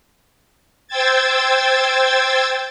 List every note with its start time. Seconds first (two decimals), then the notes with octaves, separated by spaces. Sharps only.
0.88 C5 G5 E6 G#6 A6